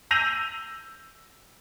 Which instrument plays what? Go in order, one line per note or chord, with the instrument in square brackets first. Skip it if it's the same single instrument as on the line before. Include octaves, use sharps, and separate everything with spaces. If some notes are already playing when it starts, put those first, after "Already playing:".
[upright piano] E6 G6 A#6 D#7 F7 F#7